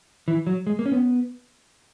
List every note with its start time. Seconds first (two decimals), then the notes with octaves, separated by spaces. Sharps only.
0.28 E3
0.47 F#3
0.67 G#3
0.79 A#3
0.86 C#4
0.92 B3